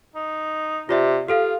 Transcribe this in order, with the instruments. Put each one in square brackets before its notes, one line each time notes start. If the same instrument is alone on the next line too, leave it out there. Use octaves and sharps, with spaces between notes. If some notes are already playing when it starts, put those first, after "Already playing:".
[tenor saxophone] D#4
[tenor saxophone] C3 [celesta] F4 D5 E5
[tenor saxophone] F4 [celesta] G4 A4 F5